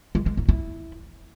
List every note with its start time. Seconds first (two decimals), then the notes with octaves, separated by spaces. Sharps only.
0.15 G#3
0.26 G#3
0.37 D#4
0.49 E4